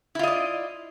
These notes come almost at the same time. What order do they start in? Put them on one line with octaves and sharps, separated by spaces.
E4 F4 D#5 D5